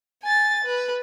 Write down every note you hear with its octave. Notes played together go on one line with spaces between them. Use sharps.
G#5 A6
B4